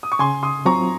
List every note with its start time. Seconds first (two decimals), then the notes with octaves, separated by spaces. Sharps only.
0.03 D#6
0.12 C#6
0.19 C#3 G#5 C6
0.43 C6 D#6
0.65 F#3 C4 F4 A#5 C#6